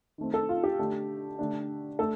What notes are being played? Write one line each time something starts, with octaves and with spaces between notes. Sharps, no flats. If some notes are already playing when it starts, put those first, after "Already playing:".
D#3 A3 C4
A4
F4
G4
D3 A3 D4
D3 A3 D4
A3 D4 A4